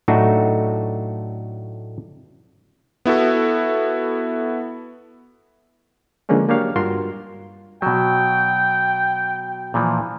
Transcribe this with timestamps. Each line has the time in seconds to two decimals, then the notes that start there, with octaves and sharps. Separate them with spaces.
0.08 A2 F#3 A3 D4 D#4 F#4
3.05 B3 E4 F#4 A4
6.29 D3 F3 G#3 A#3 C#4 D4
6.48 F#3 A#3 D4 G4 C#5 F5
6.76 G2 F4 F#4 A#4 C6
7.82 B2 F#3 G5
9.74 A#2 E3 F3